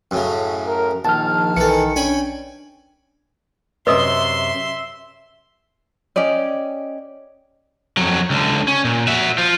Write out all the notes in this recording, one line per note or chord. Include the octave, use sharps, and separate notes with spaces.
F#2 A2 C#3
A#4
A#1 D#3 A5 F6
B1 D#3 E3 A4 C#7
C#4 D4 G5 G#5 B5
F#2 C3 B4 D#5 E5 C6 D#6
C#4 G4 D5 D#5
F2 F#3
C#2 D3
C#4
A#2
F#4 E5
F4 C5